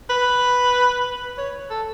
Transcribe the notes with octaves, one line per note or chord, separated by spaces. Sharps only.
B4
C#5
A4